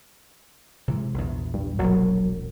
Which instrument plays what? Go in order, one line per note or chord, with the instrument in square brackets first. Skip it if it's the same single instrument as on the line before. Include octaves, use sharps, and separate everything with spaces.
[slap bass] C3 E3 G#3
A#1 E2
[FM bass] G2
[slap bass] E1 A#1 [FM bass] F#3